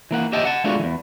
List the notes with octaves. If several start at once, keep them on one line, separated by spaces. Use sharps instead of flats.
E3 A#3 F#5
G4 D#5 E5 G5 A5
F#5 A5
G#3 A3 B3 D4 F4 F#4
E2 E3